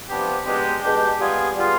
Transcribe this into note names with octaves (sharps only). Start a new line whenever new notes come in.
C3 F3 B3 D4 G4
B2 G#3 D4 G4
B2 G#3 D4 G4
G3 B3 F4 G#4
G3 B3 F4 G#4